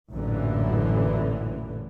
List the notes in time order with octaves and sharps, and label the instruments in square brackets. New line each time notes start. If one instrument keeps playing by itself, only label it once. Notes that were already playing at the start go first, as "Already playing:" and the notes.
[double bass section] A1 F#2 A#2 D3 E3